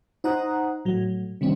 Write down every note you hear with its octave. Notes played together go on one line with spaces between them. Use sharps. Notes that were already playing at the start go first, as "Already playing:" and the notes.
D#4 C5 F#5 A#5 D#6 F#6
A2 F#3
C3 D#3 G3 C4 D4